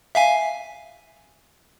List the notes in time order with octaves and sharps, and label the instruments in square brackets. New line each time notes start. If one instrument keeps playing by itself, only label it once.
[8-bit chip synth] E5 F5 G#5